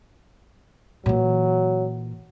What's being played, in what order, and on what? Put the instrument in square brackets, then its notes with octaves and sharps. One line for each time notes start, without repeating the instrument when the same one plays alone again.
[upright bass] A#2 E3 [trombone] F#3